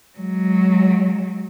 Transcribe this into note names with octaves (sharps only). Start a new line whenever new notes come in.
F#3 G#3